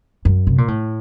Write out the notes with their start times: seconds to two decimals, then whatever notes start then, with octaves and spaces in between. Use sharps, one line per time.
0.25 F#2
0.47 C3
0.58 A#2
0.68 A2